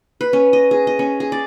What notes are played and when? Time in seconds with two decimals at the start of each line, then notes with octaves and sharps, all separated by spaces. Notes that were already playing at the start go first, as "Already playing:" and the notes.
0.21 B4
0.33 C#4
0.53 D#5
0.71 G#4
0.87 D#5
0.99 C#4
1.20 G#4
1.32 D5